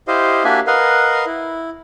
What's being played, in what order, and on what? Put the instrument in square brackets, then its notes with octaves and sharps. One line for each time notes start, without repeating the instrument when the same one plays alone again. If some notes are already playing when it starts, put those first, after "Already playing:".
[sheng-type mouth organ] E4 G4 C5 D#5 F5
A#3 D4 F#4 G4 E5 G#5
A#4 B4 D#5 F5 F#5
E4